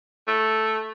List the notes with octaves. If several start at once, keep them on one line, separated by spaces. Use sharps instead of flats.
A3